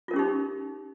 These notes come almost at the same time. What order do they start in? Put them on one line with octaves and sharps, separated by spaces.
F4 A#4 C#4 G4 D#4